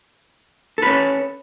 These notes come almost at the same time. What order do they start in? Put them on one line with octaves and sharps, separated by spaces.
A4 B4 C#4